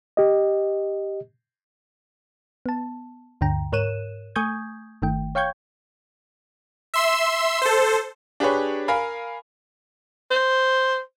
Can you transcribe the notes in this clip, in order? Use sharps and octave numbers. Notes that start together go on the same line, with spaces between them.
G4 D#5
B3 A5
D2 G2 D3 G5 A#5
G#2 A#4 C#5 F#6 D#7 E7
A3 G#5 C#6 D#6 G6 G#6
G1 D#3 A3 G5
C#5 F5 G5 C#6 G6 G#6
E5 C6 E6
A4 C5
D4 G4 G#4 B4 C#5
A#4 F5 G#5 B5
C5